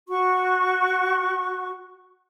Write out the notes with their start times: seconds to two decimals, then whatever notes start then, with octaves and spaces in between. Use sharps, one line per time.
0.08 F#4 C#6